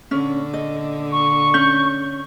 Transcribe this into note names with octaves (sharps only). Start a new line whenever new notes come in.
A#2 D3 C#4
D#5
C#6
C#4 G6